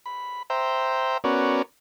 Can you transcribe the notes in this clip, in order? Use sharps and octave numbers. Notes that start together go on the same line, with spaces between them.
B5
C5 E5 G5 A#5
B3 C#4 F#4 A#4 D5